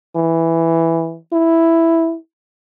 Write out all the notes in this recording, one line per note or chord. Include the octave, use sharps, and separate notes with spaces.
E3
E4